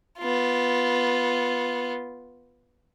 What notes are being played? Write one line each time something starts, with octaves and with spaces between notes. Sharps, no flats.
B3 F4